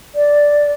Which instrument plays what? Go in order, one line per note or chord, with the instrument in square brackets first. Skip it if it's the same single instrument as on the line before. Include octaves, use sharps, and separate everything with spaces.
[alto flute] D5